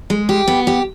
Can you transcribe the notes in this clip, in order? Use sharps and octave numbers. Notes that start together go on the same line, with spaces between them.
G#3
G4
B3
G4